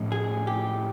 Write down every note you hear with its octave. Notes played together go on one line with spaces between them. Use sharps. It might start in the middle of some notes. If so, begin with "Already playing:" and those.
Already playing: A2 F3 A3 C#4
G#4
G4